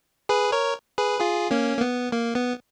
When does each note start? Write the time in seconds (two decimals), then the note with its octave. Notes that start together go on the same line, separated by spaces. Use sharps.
0.29 G#4 B4
0.52 A#4 C#5
0.98 G#4 B4
1.20 F4 G#4
1.51 A#3 C#4
1.77 A#3
1.81 B3
2.12 A#3
2.35 B3